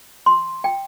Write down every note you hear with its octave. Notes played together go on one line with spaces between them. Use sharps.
C6
G5